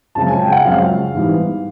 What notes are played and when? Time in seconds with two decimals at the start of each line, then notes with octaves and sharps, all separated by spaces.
0.15 F#2 C#3 F3 G#3 C4 A5
0.28 G#5
0.40 G5
0.52 F#5
0.65 F#2 C#3 F3 G#3 C4 F5
1.14 G#2 E3 G3 B3